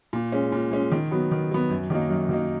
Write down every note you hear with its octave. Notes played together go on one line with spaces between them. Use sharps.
A#2
G#3 C#4
A#2
G#3 C#4
D#3
F#3 B3
D#3
F#3 B3
F#2
D#3 F#3 A#3 D#4
F#2
D#3 F#3 A#3 D#4